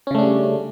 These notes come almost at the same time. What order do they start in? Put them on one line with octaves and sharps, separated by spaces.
C#4 C#3 A3 D4 G3